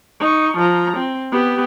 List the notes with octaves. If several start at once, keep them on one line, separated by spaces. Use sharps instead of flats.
D#4 C#6
F3 A#5
C4
B3 G4